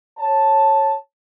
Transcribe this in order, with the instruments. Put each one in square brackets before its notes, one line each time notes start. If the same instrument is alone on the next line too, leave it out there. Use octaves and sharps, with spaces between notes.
[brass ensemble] C#5 A5